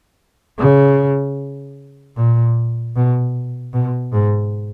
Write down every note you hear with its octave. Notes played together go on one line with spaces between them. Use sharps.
C#3
A#2
B2
B2
G#2